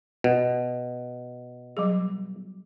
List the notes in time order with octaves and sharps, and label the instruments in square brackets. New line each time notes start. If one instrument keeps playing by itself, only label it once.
[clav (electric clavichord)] B2
[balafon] F#3 G3 G#4